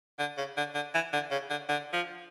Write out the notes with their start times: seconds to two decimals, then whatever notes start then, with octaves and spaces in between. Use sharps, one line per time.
0.19 D3
0.37 C#3
0.57 D3
0.75 D3
0.94 E3
1.13 D3
1.31 C#3
1.50 D3
1.69 D3
1.93 F3